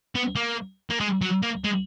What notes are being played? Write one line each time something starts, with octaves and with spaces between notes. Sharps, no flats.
B3
A#3
A#3
G#3
F#3
A#3
G#3